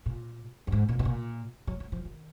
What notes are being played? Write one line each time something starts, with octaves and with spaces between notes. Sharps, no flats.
A#2
F#2
G#2
A#2
B2
A#2
F#3
F#3
F3
D#3